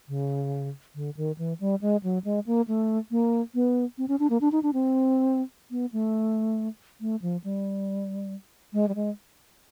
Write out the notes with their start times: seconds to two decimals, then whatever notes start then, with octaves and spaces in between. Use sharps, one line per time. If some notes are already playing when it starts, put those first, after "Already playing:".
0.08 C#3
0.95 D3
1.17 D#3
1.38 E3
1.60 G3
1.82 G#3
2.03 F#3
2.24 G#3
2.46 A#3
2.68 A3
3.11 A#3
3.55 B3
3.98 C4
4.08 C#4
4.19 D4
4.30 A#3
4.41 D4
4.52 D#4
4.63 D4
4.73 C4
5.71 B3
5.93 A3
7.01 A3
7.22 F3
7.44 G3
8.73 G#3
8.88 G3
8.95 G#3